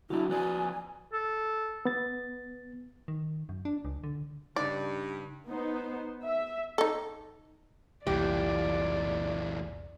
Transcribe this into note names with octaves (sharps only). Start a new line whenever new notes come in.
C#3 F#3 D4 E4 F#4
F3 B4 D5 G#5
A4
B3 A6
D#3
F#2
D4
C#2
D3
G2 C#3 D#4 D5
B3 D#4 C5
E5
D#4 A4
F1 C2 A#2 E3 G4 D5